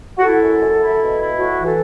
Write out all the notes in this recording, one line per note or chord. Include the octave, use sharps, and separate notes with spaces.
F#4
E4 A4
F#2
F#2
E4
B2
E4
A2 F#4
E3
A4